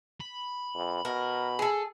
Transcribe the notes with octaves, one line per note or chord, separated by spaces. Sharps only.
B5
F2
B2 A#4
G#4 A4